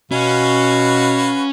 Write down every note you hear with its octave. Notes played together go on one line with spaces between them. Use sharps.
B2 C#4 F#4 B4 F5